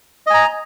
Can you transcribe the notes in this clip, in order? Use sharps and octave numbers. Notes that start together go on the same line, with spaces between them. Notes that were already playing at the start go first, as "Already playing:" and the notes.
D#5 G#5 A#5